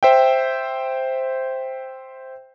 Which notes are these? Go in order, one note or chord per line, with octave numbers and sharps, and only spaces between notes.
C5 E5 G5